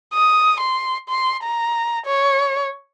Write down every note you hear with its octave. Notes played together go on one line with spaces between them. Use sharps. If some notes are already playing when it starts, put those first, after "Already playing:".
D#6
C6
C6
A#5
C#5